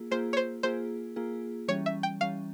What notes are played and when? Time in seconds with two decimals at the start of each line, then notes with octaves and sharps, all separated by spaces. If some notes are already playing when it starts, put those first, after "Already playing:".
Already playing: A#3 F4 G#4
0.11 A#3 F4 G#4 C5
0.33 C#5
0.37 C5
0.63 A#3 F4 G#4 C5
1.16 A#3 F4 G#4
1.68 E3 G3 C#4 C#5
1.86 E5
2.03 G5
2.21 E3 G3 C#4 F5